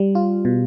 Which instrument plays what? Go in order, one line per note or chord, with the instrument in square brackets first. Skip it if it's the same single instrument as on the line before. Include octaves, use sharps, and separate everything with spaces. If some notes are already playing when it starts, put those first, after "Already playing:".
Already playing: [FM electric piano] G3
F4
B2